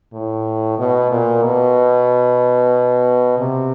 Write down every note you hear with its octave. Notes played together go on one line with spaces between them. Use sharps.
A2
B2
A#2
B2
C3